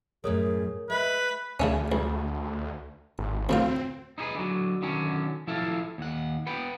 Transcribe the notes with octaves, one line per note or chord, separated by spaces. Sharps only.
F#2 A2 G3 G#4 A#4 C#5 D#6
G#3 B4 E5
D2 C#3 A3 C#4
C#2
G#1
D2 A2 C4 F4
D#4 E4 G4 G#4 B4
D3 F#3
D3 D#3 F#3 C#4
F3 E4 A4 F5
D#2 F#5
B4 F#5 G5 B5